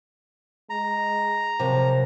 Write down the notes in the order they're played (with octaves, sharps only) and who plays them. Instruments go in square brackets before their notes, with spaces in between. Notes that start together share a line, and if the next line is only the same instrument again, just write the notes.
[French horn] G#3 [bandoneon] A#5
[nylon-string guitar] C3 F3 F#3 [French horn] A#4